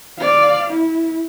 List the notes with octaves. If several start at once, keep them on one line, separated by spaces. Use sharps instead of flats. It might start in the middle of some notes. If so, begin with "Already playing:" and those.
D5 F5
E4